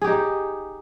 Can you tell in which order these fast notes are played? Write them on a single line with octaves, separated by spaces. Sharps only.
G#4 G4 D#4